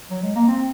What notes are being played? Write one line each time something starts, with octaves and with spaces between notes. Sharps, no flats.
F#3
G#3
A#3
C4